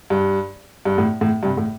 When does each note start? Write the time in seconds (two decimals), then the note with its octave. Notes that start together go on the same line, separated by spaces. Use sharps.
0.10 G2
0.85 G2
0.98 A2
1.21 A2
1.43 G2 C3
1.57 A2